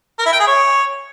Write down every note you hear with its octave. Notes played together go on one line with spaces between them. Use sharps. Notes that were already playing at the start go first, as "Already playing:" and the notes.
A#4
E4
G5
G#4
C#5